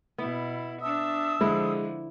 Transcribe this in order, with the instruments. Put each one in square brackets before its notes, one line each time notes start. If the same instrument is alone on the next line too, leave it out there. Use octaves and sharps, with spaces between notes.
[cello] B2 E4 [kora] B3
[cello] D4 E5 [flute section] A5 D#6 E6
[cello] D3 F3 [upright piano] G#3 [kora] E4